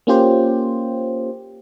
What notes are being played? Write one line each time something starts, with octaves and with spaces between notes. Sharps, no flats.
A#3 C#4 F4 G4 C5